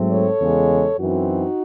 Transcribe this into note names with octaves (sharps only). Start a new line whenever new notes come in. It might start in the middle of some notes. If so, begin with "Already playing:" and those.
Already playing: G#2 F#3 A3 C4
A4 C#5
E2 C#3 G#3
F#2 E3 C4 D#4 F#4